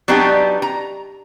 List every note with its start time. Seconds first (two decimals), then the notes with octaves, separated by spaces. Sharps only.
0.08 F#3 B3 D4 D#4 G4
0.62 A#5